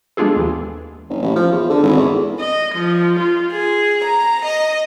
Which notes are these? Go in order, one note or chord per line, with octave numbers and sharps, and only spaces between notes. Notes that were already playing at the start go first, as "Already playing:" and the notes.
G#3 B3 D4 F4 G#4 A4
D#2 E3
F#1
A1
F3
E2
D3
G#1
E2
D#5
F3
F4
G#4
A#5
D#5